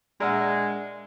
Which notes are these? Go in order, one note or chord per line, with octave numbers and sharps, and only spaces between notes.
A#2 G#3 D4 A#4 D5 E5 F#5